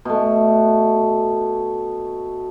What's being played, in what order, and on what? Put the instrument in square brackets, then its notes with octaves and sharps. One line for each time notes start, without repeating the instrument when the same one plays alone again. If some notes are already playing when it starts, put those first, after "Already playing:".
[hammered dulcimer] B2 A3